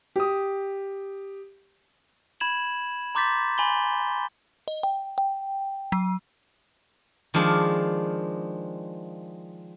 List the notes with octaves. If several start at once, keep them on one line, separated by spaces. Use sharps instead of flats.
G4 D#6
B5 G#6 E7 F#7
A#5 C6 D6 G6 A6 B6
G#5 B5 C6 G7
D#5
G5
G5
F#3
D#3 F3 G#3 D4